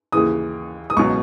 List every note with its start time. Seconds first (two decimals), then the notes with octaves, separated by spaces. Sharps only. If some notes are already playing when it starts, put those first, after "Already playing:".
0.12 D#2 C#3 E3 D#6
0.90 D#6
0.97 C#2 B2 F#3 C#6